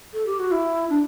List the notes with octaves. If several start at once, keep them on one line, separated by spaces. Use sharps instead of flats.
A4
G4
F#4
E4
D4